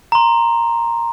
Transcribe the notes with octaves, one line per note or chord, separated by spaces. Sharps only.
A#5 C6